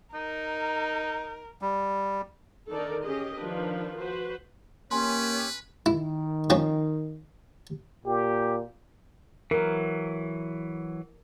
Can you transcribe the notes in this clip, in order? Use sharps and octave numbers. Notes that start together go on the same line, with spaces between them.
D#4 A#4
G3
D3 D#3 D#4 A4 A#4 D5
C#4 G4 G#4 D#5
D#3 F3 D4 B4
F#4 B4 C5
A#3 C#4 G4 B4 C#5 G#5 C6
D#3 E4
F3 C4 C#4
A#2 G4
E3 F#3 A#4